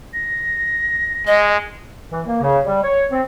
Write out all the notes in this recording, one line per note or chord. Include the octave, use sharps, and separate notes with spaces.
A#6
G#3 D#5
E3
A#3
C#3
G3
C#5
C4